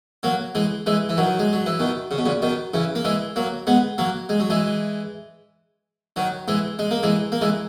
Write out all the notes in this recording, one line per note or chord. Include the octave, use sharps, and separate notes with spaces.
F#3 A#3
E3 G#3
E3 G#3
E3
D#3 F#3
G#3
F#3
E3
B2 D#3
C#3
B2
A#2 C#3
B2 D#3
C#3 E3
A#3
E3 G#3
F#3 A#3
G#3 B3
F#3 A#3
G#3
F#3
E3 G#3
D#3 F#3
E3 G#3
G#3
A#3
E3 G#3
A#3
E3 G#3